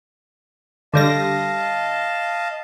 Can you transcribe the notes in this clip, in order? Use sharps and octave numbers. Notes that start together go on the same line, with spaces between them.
D3 G3 D#5 F5 A5 A#6